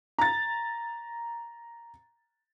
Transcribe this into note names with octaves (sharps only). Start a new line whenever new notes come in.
A#5 A6